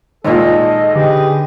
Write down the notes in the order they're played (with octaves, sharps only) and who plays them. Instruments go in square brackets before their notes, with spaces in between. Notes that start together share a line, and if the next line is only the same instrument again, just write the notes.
[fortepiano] G#1 A#2 [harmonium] A4 [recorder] D#5
[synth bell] D3 [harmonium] G4 G#4 B4